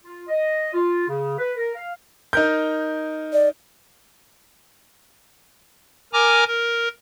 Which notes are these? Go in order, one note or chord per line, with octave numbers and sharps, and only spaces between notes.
F4
D#5
F4
C#3
B4
A#4
F5
D#4 A#4 G6
D5
A#4 G#5 A#5 D6 F6 A#6
A#4